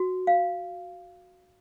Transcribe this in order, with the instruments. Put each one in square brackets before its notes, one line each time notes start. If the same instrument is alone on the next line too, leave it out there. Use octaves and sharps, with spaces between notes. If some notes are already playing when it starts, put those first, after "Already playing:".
Already playing: [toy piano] F#4
F5